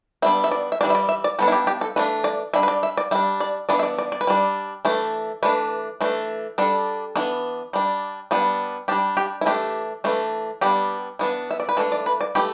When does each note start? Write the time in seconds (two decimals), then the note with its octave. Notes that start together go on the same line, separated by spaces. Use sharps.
0.22 G3 B3 D4 E5
0.44 E5
0.51 D5
0.72 E5
0.81 E3 G3 D4 D5
0.90 E5
0.95 D5
1.09 E5
1.24 D5
1.39 G3 B3 D4 A4
1.48 E4
1.52 G4
1.67 G4
1.81 A4
1.96 E3 A3 D4 B4
2.24 D5
2.54 G3 D4 E5
2.63 B4
2.68 D5
2.83 E5
2.97 D5
3.11 G3 E5
3.15 D4
3.40 D5
3.69 E3 B3 D4 D5
3.79 E5
3.83 D5
3.98 D5
4.12 D5
4.21 B4
4.27 G3 D4 D5
4.85 E3 A3 D4
5.43 E3 A3 D4 B4
6.01 E3 A3 D4
6.58 G3 D4 A4
7.16 E3 B3 D4
7.73 G3 D4
8.31 G3 B3 D4
8.88 G3 D4 G4
9.17 G4
9.41 E4
9.46 E3 A3 D4 G4
10.04 E3 A3 D4
10.61 G3 B3 D4 G4
11.19 E3 B3 D4
11.51 E5
11.60 D5
11.69 B4
11.77 E3 A3 D4 A4
11.92 D5
12.06 B4
12.21 D5
12.35 E3 A3 G4